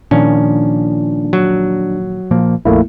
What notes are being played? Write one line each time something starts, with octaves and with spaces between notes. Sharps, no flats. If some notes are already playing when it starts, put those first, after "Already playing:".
A#2 D#3 F3 C#4 D4
F#3
A#2 F3 A#3
A#1 F2 A3 A#3 E4